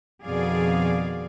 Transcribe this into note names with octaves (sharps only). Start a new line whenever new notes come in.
F2 B2 D#3 G#4 D5 F5